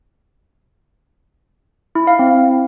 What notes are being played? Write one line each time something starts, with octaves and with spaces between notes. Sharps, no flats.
E4
F5
C4